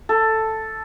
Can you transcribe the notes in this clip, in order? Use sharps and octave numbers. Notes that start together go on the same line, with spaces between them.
A4